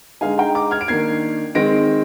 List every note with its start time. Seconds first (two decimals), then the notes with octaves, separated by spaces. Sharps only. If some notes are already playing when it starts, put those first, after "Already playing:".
0.21 D3 G#3 D#4 F5 G#5
0.38 G5 A#5
0.55 A#5 D6
0.71 F6 G#6
0.81 D7
0.88 D#3 A#3 D4 G#6 C7
1.55 D#3 G#3 C4 A#6 D7